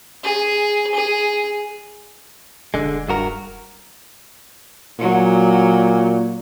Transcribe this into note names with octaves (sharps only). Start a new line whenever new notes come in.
G#4
G#4
E1 D3 G#3
G2 F#4 A#4
A#2 F#3